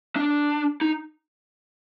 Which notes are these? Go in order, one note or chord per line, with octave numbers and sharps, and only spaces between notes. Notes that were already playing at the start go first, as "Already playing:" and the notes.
D4
D#4